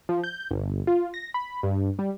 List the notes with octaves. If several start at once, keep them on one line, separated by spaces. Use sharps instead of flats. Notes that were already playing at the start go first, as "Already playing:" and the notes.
F3
G6
G1
F4
A#6
B5
G2
G3